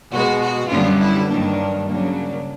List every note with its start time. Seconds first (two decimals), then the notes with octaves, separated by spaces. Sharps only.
0.11 B2 G#3 B3 F#4
0.40 F#4
0.69 F#2 D3 G3 B3 F4
0.99 E4
1.29 G2 D#3 F#3 A#3 D4
1.87 C#3 F#3 A#3 D4